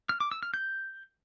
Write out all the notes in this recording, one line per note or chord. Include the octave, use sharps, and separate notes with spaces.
F6
D6
E6
F6
G6